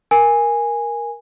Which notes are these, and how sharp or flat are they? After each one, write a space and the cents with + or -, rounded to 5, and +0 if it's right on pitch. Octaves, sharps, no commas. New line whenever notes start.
A#4 +10 G#5 -10